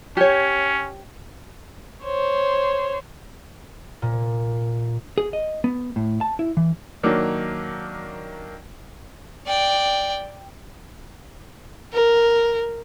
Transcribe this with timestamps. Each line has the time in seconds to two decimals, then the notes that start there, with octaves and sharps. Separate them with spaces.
0.17 C#4 G4 C#5
2.05 C5 C#5
4.02 A#2
5.18 G#4
5.33 D#5
5.64 B3
5.96 A2
6.21 A5
6.39 E4
6.57 E3
7.03 D#3 F#3 A#3 D4
9.47 D5 G5
11.93 A#4